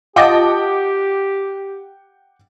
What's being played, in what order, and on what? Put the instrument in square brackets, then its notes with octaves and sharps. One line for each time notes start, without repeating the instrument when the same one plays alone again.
[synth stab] F4 D#5 A5 [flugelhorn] G4 [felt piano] F#5 G5 D6